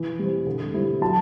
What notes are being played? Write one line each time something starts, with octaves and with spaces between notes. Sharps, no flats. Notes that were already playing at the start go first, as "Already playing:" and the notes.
Already playing: E3
G3 C4
D3
G3 C4 E4
F#3 A5